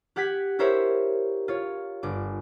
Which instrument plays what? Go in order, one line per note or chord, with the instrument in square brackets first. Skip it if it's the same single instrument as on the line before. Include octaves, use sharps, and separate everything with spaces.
[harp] G4 F#5 F#6 G#6 B6
E4 G4 A#4 C5 C#5 E5
F4 C#5
G1 D6